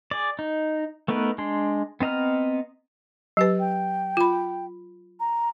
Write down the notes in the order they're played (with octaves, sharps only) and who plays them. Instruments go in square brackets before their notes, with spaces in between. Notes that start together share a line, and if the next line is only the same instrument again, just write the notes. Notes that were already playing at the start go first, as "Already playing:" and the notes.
[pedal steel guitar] G#4 D5
D#4
A3 B3 D#4 A#4 B4
G#3 D4 C6
B3 C4 D#5 A#5 F6
[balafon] F#3 G4 B4
[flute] G5
[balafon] F4 B5
[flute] A#5